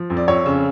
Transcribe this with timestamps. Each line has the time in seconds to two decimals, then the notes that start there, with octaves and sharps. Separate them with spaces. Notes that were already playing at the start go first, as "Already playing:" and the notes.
Already playing: F3
0.10 F2
0.17 D5
0.28 F2 C#5
0.46 C#3